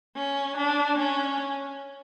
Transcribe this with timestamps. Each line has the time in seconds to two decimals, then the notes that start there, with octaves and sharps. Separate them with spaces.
0.16 C#4
0.57 D4
0.97 C#4